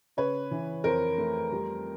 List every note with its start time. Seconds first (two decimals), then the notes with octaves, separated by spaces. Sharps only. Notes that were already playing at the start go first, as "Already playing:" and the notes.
0.17 C#3 B4 C#5
0.51 E3
0.84 F2 A#4 C5
1.18 A3
1.52 G3